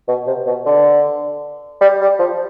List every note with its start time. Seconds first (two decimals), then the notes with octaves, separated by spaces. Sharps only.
0.08 B2
0.27 C3
0.47 B2
0.66 D3
1.81 G3
2.01 G3
2.19 F3